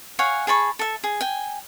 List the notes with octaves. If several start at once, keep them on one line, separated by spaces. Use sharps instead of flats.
C#5 F5 F#5 G#5
G#4 A5 B5 C#6
A4 E5
G#4
G5 G#5